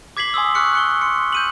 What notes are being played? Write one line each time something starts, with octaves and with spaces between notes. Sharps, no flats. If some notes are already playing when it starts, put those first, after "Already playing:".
D6 G#6 B6 C7 F#7
G#5 C6 D#6 E6
C#6 F6 F#6 C#7
F#6 C#7 G7
C6 C#7
G6 D#7 F#7